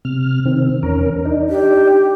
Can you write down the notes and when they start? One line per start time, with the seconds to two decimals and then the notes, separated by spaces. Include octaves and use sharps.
0.05 C3 F6
0.45 C3 D#3 C4
0.83 E2 C#4 A#4
1.25 D4 D#4
1.49 G4